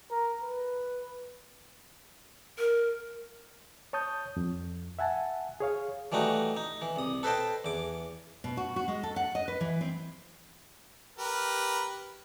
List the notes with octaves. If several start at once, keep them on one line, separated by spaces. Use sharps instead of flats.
A#4
B4
A#4
C#5 A5 D#6 G6
F2
E5 F#5 G#5 A5
G#4 C#5 F5
E3 G3 A3 D#4 F#4
D#4
E3
C2 D#6
A4 B4 C5 D#5 G5 A5
E2 D6
B2
F#4
F#4
G#3
A4
F#5
D#5
B4
E3
C4
G4 A#4 B4